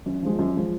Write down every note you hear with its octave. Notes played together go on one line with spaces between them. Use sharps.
F#2
F3 G#3
F#2
F3 G#3